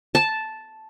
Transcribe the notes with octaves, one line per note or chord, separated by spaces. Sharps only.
A5